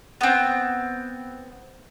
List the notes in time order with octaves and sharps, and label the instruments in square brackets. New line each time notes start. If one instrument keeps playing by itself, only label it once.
[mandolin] B3 C4